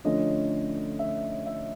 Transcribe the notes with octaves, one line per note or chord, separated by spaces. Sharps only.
D3 F3 A3 C#4 D#5
E5
E5